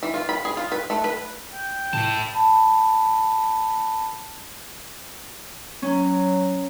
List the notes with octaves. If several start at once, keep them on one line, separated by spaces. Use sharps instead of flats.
E3
F4
B5
G#4
F4
B4
A3
B4
G5
A2 E4 A5
A5 B5
F#3 C#4